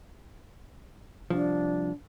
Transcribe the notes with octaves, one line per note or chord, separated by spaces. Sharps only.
C2 F3 D4